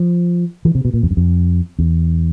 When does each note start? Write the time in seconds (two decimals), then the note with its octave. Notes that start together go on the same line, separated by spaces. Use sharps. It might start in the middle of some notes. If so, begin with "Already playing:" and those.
Already playing: F3
0.65 E3
0.75 C3
0.85 B2
0.94 A#2
1.03 F2
1.11 F#2
1.17 F2
1.79 E2